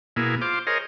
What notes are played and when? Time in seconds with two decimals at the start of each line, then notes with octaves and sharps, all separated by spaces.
0.16 B2 A#3 E4 G#4
0.42 F4 C5 D6
0.67 G#4 A#4 C5 C#5 D#5